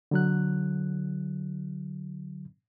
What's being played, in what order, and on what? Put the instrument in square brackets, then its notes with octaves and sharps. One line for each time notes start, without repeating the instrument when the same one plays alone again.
[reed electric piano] D3 F#3 F#6